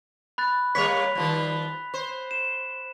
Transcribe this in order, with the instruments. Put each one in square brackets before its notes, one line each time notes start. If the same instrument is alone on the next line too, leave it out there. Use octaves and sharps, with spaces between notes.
[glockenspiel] B5 F#6 A6
[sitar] G3 A#3 C#5 [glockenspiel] B6 F7
[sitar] D#3 F3 G3
C5
[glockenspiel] E7